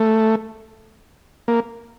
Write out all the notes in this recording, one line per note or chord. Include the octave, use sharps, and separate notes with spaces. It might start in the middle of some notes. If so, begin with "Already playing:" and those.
Already playing: A3
A#3